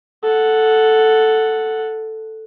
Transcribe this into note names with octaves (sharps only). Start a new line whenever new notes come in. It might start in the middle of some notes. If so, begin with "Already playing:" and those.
A4 F#5